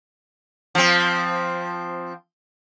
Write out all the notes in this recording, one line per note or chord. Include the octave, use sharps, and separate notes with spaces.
F3 C4